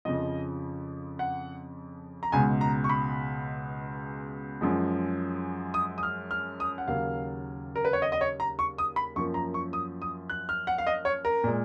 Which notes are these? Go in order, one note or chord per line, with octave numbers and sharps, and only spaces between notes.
F2 C#3 F3 D#5
F#5
A#5
C#2 B2 G#3 G#5
A#5
C#6
B5
F#2 F3 G#3
D#6
D#6
F6
F6
D#6
F#5
D#2 C#3 F#3 A#3 F5
A#4
B4
C#5
D#5
D#5
C#5
A#5
C#6
D#6
B5
F#2 F3 A#3 C#6
A#5
C#6
D#6
D#6
F#6
F6
F#5
F5
D#5
C#5
A#4
A#2 G#3